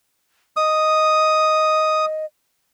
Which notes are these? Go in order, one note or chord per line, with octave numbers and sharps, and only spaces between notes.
D#5 D#6